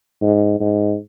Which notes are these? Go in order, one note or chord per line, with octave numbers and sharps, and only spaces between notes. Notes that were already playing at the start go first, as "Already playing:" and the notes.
G#2
G#2